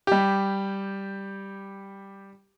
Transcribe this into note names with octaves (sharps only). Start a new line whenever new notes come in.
G3 G4